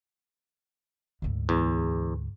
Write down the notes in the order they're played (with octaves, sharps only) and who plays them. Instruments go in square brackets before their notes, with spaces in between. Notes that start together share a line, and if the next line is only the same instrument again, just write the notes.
[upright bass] D2 G#2
[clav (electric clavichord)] E2